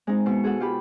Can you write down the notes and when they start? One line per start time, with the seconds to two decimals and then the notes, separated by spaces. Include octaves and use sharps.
0.07 G#3 C4 D#4
0.26 B2 C#6
0.43 F#4 G#4 A4 F#5
0.60 F4 G4 B5